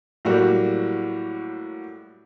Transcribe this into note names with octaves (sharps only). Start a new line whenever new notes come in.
A2 F#3 G3 A#3 F#4 G4